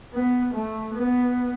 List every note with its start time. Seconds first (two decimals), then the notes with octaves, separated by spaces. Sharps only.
0.14 B3
0.54 A3
0.94 B3